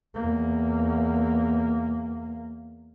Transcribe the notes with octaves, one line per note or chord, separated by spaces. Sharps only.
E2 A#3